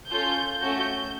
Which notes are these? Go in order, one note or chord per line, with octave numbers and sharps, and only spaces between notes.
C#4 F4 A4 G6
A3 C#4 F#4 A4 G6